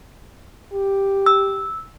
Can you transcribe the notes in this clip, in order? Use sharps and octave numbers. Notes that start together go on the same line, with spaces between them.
G4
E6